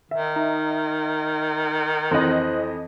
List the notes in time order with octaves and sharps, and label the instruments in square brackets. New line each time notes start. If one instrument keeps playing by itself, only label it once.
[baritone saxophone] D#3 [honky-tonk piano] E5
[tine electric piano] D#4
[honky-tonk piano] F2 E3 D#5 [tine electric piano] C5 F#6